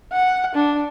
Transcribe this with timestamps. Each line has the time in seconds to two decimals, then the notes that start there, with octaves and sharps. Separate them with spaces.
0.12 F#5
0.55 D4